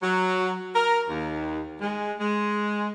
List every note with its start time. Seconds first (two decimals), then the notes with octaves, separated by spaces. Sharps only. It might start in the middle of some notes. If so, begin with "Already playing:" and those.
0.03 F#3
0.75 A#4
1.09 D#2
1.81 G#3
2.20 G#3